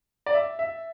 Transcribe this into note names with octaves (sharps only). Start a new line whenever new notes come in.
D5
E5
E5